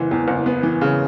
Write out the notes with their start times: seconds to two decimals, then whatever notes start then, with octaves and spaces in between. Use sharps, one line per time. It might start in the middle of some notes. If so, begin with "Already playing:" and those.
Already playing: F#1 E3
0.11 E2
0.28 F#1
0.46 B3
0.63 E3
0.81 C#3